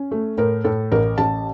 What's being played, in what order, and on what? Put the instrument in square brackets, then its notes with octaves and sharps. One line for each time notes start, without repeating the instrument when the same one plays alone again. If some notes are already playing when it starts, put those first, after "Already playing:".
Already playing: [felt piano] C#4
A3
A2 A#4
A2 A4
A1 A#4
A1 A5